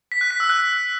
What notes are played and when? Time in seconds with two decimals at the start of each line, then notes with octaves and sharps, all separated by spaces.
0.12 B6
0.21 F#6
0.31 B6
0.40 E6
0.50 F#6